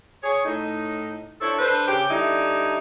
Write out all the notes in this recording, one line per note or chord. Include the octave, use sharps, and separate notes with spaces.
G#4 C#5
A2 D#4
D4 E4 A4 C5 C#5
D4 A4 B4 C5
C#3 G4
D3 G3 D#4 E4